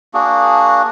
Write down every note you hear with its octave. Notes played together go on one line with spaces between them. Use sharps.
A#3 D4 F#4 G#4